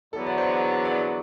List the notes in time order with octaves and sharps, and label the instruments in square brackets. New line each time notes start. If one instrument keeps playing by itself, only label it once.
[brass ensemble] E2 D3 F#3 B3 [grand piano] A4
[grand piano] D5
C5
D5